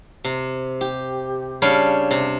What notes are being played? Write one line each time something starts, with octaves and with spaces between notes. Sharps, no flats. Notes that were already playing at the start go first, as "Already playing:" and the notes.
C3
G4
C#3 G3 D4 C#5 F5 B5
C3